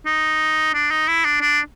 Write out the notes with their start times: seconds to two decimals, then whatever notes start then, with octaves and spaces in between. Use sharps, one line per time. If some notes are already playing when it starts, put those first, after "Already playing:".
0.06 D#4
0.74 D4
0.91 D#4
1.08 E4
1.25 D4
1.41 D4